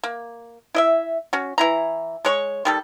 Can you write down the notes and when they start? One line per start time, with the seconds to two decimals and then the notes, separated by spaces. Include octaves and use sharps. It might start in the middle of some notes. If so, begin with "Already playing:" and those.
0.04 A#3
0.75 E4 D#5 E5
1.33 C#4 F#4
1.58 E3 E4 A#5
2.25 G#3 C#5 C#6
2.65 D#3 G3 A4